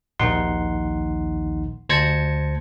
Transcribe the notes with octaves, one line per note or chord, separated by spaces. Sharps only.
A#1 D#2 D#3 D#4 F#5 C6
D2 C5 A5 G#6 A#6 C#7